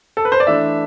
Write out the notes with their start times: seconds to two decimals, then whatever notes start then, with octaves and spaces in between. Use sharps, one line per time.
0.17 A4
0.25 B4
0.32 C5
0.40 D5
0.47 E3 A3 D4 E5